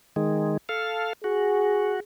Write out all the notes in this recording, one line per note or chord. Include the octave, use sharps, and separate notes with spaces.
D#3 G#3
A4 F5
F#4 G#4